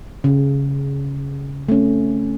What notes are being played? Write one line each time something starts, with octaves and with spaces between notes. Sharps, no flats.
C#3
A3 C4 C#4